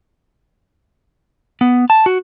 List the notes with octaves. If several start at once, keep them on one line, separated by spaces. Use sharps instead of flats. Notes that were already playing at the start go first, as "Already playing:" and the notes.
B3
A5
F#4